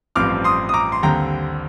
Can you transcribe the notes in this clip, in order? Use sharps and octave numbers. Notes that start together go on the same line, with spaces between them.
A1 G2 F3 C4 D6 F6
C6 D#6
D#6
A#5 D6
C6
D#2 D3 G3 C4 G5 A#5